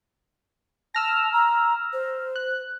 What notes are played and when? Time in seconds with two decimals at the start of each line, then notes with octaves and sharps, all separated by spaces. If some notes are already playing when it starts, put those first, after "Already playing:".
0.95 A5 E6 F6 A#6
1.33 A#5
1.93 C5
2.36 F#6